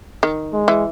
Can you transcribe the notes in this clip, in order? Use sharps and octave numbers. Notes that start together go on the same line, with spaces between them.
D#3
G#3
E3